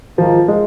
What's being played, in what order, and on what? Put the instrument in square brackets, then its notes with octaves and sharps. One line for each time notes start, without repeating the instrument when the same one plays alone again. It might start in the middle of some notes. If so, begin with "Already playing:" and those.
[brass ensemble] G#2 D#3 A#3 F4 [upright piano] F3
[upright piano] G#3